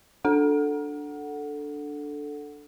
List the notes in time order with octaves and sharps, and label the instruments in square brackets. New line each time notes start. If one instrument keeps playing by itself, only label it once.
[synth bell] D4 A4 F#5